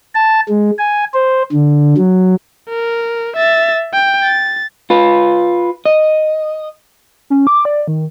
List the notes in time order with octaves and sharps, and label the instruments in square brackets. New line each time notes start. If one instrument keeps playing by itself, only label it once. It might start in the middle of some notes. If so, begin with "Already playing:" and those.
[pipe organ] A5
G#3
G#5
C5
D3
F#3
[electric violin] A#4
E5 A6
G5
A6
[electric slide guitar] F4 B4
D#5
[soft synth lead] C#4
D6
D5
D#3